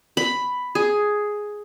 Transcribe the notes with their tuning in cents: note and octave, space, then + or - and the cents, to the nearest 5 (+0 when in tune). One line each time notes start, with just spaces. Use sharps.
B5 +5
G#4 +5